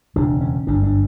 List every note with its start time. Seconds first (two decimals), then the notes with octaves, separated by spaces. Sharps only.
0.16 E1 D2 C#3 D4
0.41 C#4
0.67 G1 F#2 D3 D4
0.83 D4